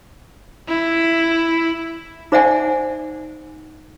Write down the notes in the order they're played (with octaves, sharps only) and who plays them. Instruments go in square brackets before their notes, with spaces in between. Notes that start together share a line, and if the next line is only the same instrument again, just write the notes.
[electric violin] E4
[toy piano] D#4 C5 D5 E5 F#5 G#5